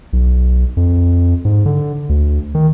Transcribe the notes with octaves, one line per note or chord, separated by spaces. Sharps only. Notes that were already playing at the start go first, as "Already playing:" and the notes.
B1
F2
G#2
D3
D2
D#3